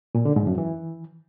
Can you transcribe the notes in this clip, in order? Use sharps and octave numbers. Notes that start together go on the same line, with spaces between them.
A#2
D3
G#2
F#2
E3